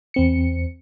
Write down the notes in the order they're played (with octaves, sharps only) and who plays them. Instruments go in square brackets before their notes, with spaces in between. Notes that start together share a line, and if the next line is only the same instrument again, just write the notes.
[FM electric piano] E2 C4 C#7